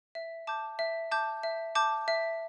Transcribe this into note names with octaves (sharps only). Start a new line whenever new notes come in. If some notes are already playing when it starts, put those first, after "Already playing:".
E5
A5 D6 G6
E5
A5 D6 G6
E5
A5 D6 G6
E5